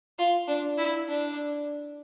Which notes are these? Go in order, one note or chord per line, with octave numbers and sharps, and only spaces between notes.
F4
D4
E4
D4